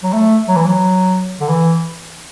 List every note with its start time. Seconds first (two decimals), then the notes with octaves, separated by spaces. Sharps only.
0.03 F#3
0.13 A3
0.48 F#3
0.56 E3
0.66 F#3
1.40 D3
1.49 E3